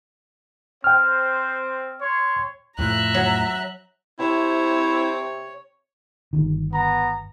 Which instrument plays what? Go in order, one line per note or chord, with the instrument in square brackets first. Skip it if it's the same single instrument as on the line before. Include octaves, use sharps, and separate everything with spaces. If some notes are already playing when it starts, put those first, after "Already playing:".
[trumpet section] C4 C5 [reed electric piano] G5 F6
[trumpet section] C#5 C6
[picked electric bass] F2 A2 F3 [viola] E5 A#5 [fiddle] F#6
[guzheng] F#3
[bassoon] C3 [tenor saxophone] C4 [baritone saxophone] E4 [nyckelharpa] C#5
[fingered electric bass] G1 D#3
[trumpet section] B3 A#5